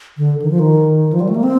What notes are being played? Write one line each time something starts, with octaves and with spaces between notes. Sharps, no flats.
D3
D#3
F3
D#3
F3
G3
A3
A#3
C4